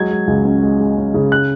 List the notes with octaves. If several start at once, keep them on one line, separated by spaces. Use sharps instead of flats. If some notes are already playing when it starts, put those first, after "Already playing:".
Already playing: F#3 G#3 G#6
G#3
C#2
C#4
G#3
G#3
C#4
C#3
F#6